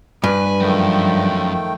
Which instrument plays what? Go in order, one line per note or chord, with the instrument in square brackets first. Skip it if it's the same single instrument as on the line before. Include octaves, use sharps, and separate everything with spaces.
[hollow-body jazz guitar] G2 [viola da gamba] B4 [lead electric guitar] G#5
[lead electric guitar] F#2 [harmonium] D#3 A3 G5 [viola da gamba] F3